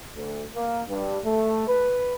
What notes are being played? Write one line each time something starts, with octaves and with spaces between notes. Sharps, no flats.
D2
A#3
G2
A3
B4